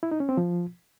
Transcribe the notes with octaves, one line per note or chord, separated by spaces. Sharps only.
E4
D#4
C#4
C4
F3